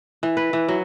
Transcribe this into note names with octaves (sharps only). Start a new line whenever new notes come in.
E3
B4
E3
F#3